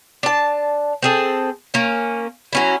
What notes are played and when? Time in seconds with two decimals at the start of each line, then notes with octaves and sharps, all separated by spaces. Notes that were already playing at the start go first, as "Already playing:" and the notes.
0.23 D4 A5
1.02 C4 G#4 A4
1.74 A#3 C#4
2.53 F#3 C#4 E4